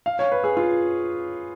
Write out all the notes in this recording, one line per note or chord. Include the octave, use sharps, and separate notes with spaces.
F5
C#5
B4
G#4
F4